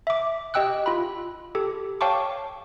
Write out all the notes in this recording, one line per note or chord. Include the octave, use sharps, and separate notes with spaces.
E5 D6
G4 D#5 G5 E6 F#6
F4 B5
G4 A4
C#5 F5 G5 A5 C#6 D6